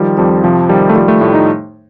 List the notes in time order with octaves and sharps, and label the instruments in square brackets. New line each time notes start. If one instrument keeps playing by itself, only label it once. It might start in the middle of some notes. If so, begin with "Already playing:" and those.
Already playing: [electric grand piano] D#3 F3 G3
F2 G3
C3 F3
D#3 G3
A3
F3 G3
A3
A2
D#4